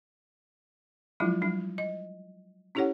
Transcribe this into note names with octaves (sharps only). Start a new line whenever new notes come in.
F3 F#3 G#3 D4 E4 F4
F#3 G3 D4
D#5
C#4 E4 G4 A4 C#5 F#5